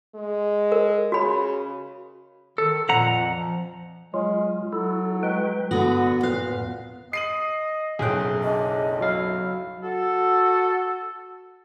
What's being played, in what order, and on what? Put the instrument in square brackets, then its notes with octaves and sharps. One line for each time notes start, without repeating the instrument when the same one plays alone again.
[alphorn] G#3
[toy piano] A#4
[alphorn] C#3 [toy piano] F#4 B5
[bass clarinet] D#3 [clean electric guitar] A4
[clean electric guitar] F2 F#5 A#5 [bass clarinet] A#2
[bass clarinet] F3
[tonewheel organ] F#3 F4 [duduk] G#3
[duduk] F#3 [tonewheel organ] E4 A4
[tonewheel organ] G#3 B4 G5
[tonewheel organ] G2 B5 D#6 [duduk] D3 [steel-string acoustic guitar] B3 F#4
[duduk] A#2 [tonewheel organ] B4 [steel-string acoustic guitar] F5
[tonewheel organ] F2 A2 B3
[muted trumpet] D#5 [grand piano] C7 D#7 F#7
[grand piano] F#1 B1 F#6 [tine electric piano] G#4 G5
[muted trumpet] D4 [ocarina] D#5
[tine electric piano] F#3 F5 [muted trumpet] E4
[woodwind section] F#4 A4